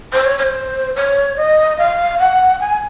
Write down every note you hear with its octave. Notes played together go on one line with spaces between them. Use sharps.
C5
C#5
C#5
C5
C#5
D#5
F5
F#5
G#5